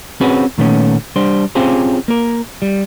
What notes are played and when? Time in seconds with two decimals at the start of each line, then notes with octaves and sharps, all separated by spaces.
0.21 C4 C#4 F#4 G#4 B4
0.58 A#2 D#3 A3 B3 C#4
1.16 G3 D4 C5
1.55 C4 C#4 F4 G4 G#4 C5
2.08 A#3 A#4
2.62 G3